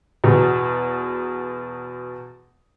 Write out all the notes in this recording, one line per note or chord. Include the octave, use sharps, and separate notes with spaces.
E2 B2